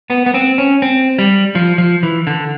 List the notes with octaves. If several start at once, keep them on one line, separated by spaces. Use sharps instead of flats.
B3
B3
C4
C#4
C4
G3
F3
F3
E3
D3